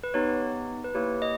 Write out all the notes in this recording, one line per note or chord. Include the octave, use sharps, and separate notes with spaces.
B4
B3 D#4 G4 C#5
B4
A#3 E4 G4 C#5
D#5